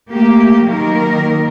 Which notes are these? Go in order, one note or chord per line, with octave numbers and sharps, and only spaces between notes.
A3 A#3 G4
D#3 F#3 A#3 A#4